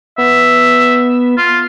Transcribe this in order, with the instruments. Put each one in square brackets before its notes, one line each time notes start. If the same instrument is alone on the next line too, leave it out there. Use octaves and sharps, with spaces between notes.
[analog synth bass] B3 [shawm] E5
[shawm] F4